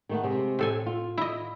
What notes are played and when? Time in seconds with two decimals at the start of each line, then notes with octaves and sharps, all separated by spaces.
0.09 D#3 A3 B3
0.23 C3 G#3
0.59 A2 A4 G#5
0.86 F4
1.18 E4 D#5